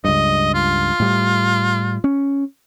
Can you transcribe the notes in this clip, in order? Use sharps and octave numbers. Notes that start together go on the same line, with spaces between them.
C#2 G2 D#5
F4
A2 G3
C#4